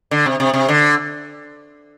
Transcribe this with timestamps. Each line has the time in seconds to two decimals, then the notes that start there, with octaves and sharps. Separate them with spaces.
0.11 D3
0.26 C3
0.40 C3
0.54 C3
0.69 D3